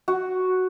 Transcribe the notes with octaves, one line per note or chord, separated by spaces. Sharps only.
F#4